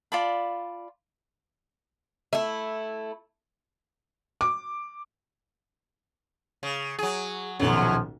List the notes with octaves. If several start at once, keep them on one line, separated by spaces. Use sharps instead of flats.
F4 D5 A5 B5
A3 E4
D6
C#3
F#3 G#4
D#1 B1 F#2 F3 F#3